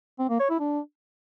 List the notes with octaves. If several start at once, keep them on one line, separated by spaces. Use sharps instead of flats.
C4
A#3
C#5
E4
D4